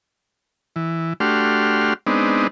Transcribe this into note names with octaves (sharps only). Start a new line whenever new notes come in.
E3
A3 D4 F#4 G4 C6 F6
G#3 B3 C4 D4 D#4